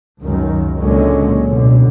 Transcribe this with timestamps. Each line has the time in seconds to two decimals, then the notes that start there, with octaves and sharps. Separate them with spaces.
0.21 C#2 F#2 D#3
0.79 C#2 A#2 D3 F#3 G#3 C#4
1.47 A1 B2 D3